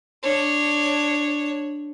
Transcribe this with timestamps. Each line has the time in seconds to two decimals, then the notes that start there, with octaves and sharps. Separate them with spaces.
0.24 D4 C#5